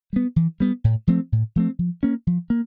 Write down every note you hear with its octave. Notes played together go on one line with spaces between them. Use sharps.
G3 B3
E3
G3 B3
A2
F3 A3 C4
A2
F3 A3 C4
F3
A#3 C#4
F3
A#3